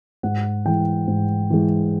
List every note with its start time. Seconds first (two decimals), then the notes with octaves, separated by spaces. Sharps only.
0.23 G#2 F#5
0.65 E3 G#3 G5
1.07 G#2
1.50 E3 G#3